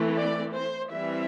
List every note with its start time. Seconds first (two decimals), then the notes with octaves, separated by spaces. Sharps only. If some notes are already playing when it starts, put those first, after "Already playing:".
Already playing: E3 A3 C4
0.17 D5
0.54 C5
0.91 E3 G3 C4 E5